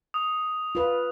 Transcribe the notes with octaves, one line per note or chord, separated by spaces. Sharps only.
D#6
F4 B4